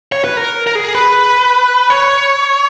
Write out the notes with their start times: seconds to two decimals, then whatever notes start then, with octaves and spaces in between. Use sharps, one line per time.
0.12 C#5
0.24 B4
0.37 A#4
0.67 A#4
0.75 G#4
0.95 B4
1.90 C#5